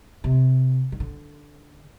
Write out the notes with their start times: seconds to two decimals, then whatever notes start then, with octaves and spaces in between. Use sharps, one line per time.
0.24 C3
0.92 D#3
1.00 D3